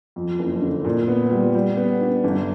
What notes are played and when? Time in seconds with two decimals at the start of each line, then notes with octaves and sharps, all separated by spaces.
0.16 F2
0.39 F#1
0.62 D3
0.85 A#2
1.08 B3
1.31 G3
1.54 G3
1.77 B3
2.01 D4
2.24 G1